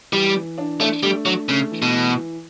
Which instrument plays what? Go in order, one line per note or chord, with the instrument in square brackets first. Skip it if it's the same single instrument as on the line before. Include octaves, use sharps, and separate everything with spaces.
[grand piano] E3 [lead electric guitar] G3
[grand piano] E3
D4
[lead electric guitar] A3 [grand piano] D4
[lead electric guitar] G3 [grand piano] A3
[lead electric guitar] F#3 [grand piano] D4
[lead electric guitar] C#3 [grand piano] A3
[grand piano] E3
[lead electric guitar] B2
[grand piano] E3
E3